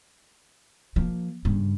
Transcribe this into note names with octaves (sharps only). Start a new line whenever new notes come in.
F3 A#3
G2 C#3